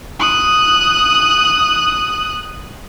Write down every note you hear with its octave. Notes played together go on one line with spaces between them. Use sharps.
D#6 F#6